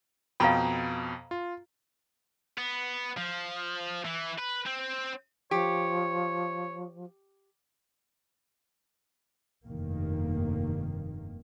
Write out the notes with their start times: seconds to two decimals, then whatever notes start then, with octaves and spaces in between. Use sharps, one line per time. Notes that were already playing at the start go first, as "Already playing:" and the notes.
0.40 F2 B2 F5 G5 A#5 B5
1.31 F4
2.58 B3
3.17 F3
4.05 E3
4.38 B4
4.66 C4
5.51 F3 G4 C#5
9.66 F1 G2 D#3 A#3